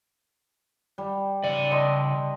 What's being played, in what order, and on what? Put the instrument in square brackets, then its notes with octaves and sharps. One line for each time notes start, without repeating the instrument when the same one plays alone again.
[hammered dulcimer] G3
[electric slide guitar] C#3 D5
[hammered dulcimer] D#5 A5 C6